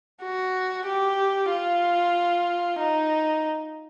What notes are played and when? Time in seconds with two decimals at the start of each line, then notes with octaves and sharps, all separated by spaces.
0.23 F#4
0.87 G4
1.51 F4
2.79 D#4